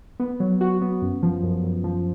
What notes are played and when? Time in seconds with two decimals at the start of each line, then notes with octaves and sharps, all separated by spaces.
0.20 B3
0.40 F#3
0.61 F#4
0.82 B3
1.02 F#2
1.23 F3
1.43 F#2
1.63 F#2
1.84 F3